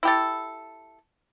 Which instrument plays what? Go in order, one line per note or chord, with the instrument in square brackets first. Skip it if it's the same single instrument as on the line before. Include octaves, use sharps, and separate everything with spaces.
[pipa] E4 G4 A4